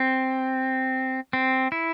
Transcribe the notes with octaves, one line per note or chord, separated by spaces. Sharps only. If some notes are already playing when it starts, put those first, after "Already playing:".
Already playing: C4
C4
E4